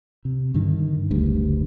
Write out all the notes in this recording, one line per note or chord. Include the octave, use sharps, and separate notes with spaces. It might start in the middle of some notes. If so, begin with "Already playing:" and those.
C3
G2 D3 D#3
F#1 D2 G2